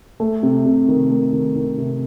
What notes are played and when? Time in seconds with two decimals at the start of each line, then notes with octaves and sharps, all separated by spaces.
0.20 A3
0.43 C3
0.65 C3
0.88 D#3
1.10 A3
1.33 D#3
1.56 D#3
1.78 C3